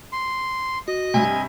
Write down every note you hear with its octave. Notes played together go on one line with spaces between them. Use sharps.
C6
F#4 D#5
G2 C3 G#5